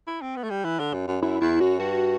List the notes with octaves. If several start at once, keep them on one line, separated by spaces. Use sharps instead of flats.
E4
C4
B3
A3
G3
E3
D3
F#2
F#2
F#2 E4
E2 E4
F#2 F#4
G2 F#4